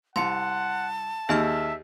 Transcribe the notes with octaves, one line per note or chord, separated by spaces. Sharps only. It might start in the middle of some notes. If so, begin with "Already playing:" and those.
C2 F#5 A5 C6 C#7
D#2 G#4 D#5 E5 F6